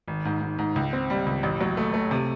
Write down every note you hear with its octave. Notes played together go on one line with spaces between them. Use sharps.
G#1
G#2
G#2
G#2
C#2
C4
G3
C#2
A1
F#3
A3
A3
C3